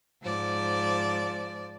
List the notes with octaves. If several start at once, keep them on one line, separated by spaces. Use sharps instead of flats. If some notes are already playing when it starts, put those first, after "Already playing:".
G#2 F3 D5